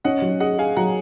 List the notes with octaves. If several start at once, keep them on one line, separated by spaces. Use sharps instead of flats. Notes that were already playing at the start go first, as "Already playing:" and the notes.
C#4 D#5 F#5
F#3
G#4 D#5 F#5
G#4 F5 G#5
F#3 F#5 A#5